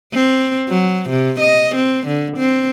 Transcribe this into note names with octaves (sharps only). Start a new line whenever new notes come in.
C4
F#3
C3
D#5
C4
D3
C4